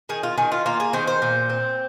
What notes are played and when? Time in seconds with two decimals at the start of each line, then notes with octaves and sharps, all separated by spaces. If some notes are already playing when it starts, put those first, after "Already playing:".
0.09 D#3 G#4
0.23 F4
0.38 D#3 G#4
0.52 F4
0.66 A#3 F4
0.80 G#4
0.93 D#3 C5
1.07 C5
1.22 A#2
1.50 C4